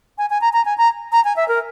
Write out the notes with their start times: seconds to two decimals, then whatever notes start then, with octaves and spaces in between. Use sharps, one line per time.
0.18 G#5
0.30 G#5
0.41 A#5
0.53 A#5
0.65 G#5
0.78 A#5
1.12 A#5
1.25 G#5
1.36 E5
1.48 A#4